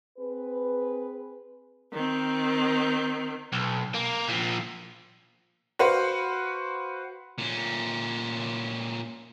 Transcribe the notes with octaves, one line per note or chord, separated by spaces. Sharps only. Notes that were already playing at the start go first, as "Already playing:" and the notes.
C4 G#4 B4
D#3 C4
B1
A#3
A#2 F3
F#4 B4 C5 F5 F#5
A#2 C#4